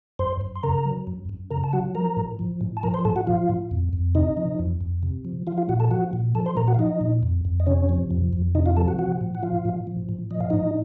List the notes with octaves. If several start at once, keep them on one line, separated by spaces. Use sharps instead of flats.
F#2 C5 C6
F#2
C6
C#3 A#4 A#5
F#3
F#2
F#2
C#3 A#4 A#5
A5
F#3 F#4 F#5
F3 A#4 A#5
A2
F3
A2
A5
F3 A#4 A#5
C5 C6
A2 A4 A5
F#4 F#5
F3 F4 F5
A2
F2
F2
C3 D#4 D#5
F3
F2
F2
C3
F3
F3 F4 F5
F4 F5
A#2 F#4 F#5
A4 A5
F3 F#4 F#5
A#2
F3 A4 A5
C5 C6
A#2 A#4 A#5
F#4 F#5
F5
F3 D#4 D#5
A#2
F2
F2
D#5
C3 C#4 C#5
F3
F2
F2
C3 D#4 D#5
F4 F5
F3 A4 A5
F#4 F#5
F3 F#4 F#5
A2
F#5
F3 F4 F5
A2
F3
A2
F3 D#5
F5
A2 D#4 D#5